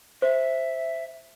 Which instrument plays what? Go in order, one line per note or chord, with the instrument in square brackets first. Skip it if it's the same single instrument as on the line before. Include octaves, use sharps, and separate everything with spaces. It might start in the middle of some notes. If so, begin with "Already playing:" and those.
[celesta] C5 [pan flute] E5